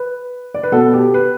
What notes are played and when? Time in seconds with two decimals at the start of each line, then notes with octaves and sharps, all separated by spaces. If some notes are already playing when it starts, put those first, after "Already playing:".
Already playing: B4
0.54 D5
0.63 B4
0.72 B2 B3 A4
0.93 G4
1.14 B4